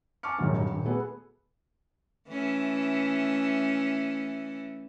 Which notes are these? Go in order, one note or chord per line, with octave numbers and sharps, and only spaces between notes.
G#5 A5 C#6 D6 F6 C#7
A#1 D#2 G#2 D#3 F#3
G2 F#3
D#1
A3 B3 F#4 G#4
E3 A3 C#4